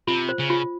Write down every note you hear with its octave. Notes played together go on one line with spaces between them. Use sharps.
C3 F4
C5
C#3
F4